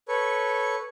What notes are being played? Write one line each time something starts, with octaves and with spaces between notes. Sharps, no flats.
A4 B4 C#5 C#6